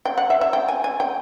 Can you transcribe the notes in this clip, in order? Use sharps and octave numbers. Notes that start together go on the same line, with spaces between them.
G5
F#5
E5
E5
G5
G#5
G#5
G5